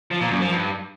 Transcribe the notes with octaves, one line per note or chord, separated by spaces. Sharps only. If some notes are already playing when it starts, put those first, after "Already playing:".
F3
A#2
F#2
F3
G2